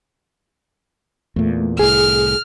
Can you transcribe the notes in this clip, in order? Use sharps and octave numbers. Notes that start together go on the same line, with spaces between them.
E2 A#2 A3
C2 A2 G#4 F6